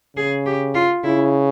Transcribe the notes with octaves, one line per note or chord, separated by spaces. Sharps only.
C#3 G#4
G4
F4
C#3 E4